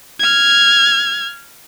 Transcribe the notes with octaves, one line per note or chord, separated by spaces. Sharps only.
F6 G#6